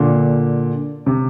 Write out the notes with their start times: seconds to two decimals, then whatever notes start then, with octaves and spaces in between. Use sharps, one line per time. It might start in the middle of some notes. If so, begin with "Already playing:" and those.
Already playing: A#2 D3
1.06 C3